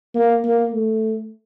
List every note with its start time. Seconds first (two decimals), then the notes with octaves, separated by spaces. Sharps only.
0.15 A#3
0.44 A#3
0.72 A3